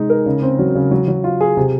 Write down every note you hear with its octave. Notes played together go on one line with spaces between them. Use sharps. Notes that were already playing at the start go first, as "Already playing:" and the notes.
Already playing: C3 G#3 D#4
A#4
C#3
C4
F#3
C#3
F#3
F#3
F4
G#4
C3